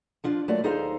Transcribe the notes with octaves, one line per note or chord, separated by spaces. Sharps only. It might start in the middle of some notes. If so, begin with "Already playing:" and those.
F3 D4 F4
F#3 A3 A#3 F4 D5
D#2 D#4 G#4 A4 C5 F5